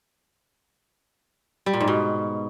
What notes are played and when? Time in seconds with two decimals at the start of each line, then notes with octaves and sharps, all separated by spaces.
1.66 G3
1.73 A#2
1.80 G#2
1.88 B2